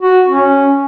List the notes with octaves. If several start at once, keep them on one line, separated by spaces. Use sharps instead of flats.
F#4
C#4